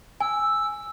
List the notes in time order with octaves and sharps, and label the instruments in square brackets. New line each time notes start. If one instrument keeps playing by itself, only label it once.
[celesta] G#5 [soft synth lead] E6